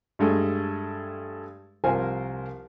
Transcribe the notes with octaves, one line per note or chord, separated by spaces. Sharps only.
G2 G#3 A3
C2 F3 A#4 C5 G#5